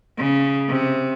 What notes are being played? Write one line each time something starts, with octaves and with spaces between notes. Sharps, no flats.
C#3
C3